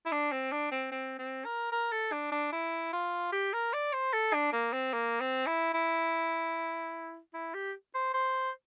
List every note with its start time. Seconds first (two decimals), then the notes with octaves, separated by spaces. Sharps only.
0.06 E4
0.12 D4
0.32 C4
0.52 D4
0.71 C4
0.92 C4
1.18 C4
1.45 A#4
1.72 A#4
1.92 A4
2.12 D4
2.32 D4
2.52 E4
2.93 F4
3.32 G4
3.53 A#4
3.73 D5
3.93 C5
4.13 A4
4.33 D4
4.53 A#3
4.73 C4
4.93 A#3
5.20 C4
5.46 E4
5.74 E4
7.34 E4
7.54 G4
7.95 C5
8.14 C5